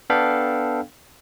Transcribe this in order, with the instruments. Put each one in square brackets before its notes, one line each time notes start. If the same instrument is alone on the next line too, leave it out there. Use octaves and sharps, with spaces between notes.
[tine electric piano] B3 D4 A4 F5 G5 B5